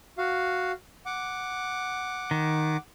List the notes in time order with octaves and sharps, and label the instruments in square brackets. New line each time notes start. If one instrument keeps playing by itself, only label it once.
[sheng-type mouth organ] F#4 F5
F#5 D6
[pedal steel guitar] D#3